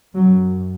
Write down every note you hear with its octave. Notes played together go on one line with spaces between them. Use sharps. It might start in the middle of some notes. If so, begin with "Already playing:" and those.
F#2 F#3